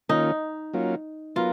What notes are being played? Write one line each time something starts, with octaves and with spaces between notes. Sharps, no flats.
D#3 A#3 C#4 D#4 F4
F#3 A#3 C#4 F4
F#3 B3 F4 A#4